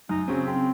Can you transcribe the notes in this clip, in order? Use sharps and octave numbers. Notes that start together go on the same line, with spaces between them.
F#2 D#4
C#3 F#3 C4 C#4
C#3 C4